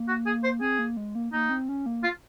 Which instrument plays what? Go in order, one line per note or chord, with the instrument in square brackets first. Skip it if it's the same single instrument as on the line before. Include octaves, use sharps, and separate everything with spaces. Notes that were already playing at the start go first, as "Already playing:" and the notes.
Already playing: [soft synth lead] A#3
[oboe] F#4
G#4
C5
[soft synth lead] C4 [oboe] G#4
[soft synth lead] A#3
G#3
A#3
[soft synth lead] A#3 [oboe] D#4
[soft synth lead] C4
C#4
A#3
[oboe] F4